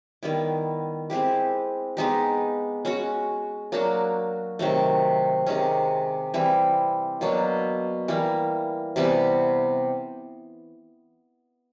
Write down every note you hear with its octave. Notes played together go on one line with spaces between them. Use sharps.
D#3 G3 B3 E4
G#3 C4 E4 G4
G#3 B3 D#4 G4
G#3 C#4 F#4
F#3 A#3 D4 F#4
C3 D#3 F#3 A3
C3 D#3 G#3 C#4
E3 G3 C4 E4
B2 F#3 A#3 D4
E3 G3 A#3
C3 E3 G3 B3